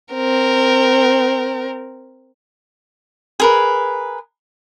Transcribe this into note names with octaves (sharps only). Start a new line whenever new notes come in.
C4 A#4
G#4 A#4 B4